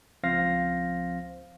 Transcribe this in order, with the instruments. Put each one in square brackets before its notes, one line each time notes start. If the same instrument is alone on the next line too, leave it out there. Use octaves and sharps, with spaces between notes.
[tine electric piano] C#2 F3 C4 C5 F5 A#6